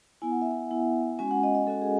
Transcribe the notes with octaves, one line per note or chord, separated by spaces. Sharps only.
B3 E4 G#5
F#5
E5
F#5
B3 E4
G#3 C#4 F#4 G#5
F#5
D#5
D#5
G#3 C#4 F#4 A4
G#4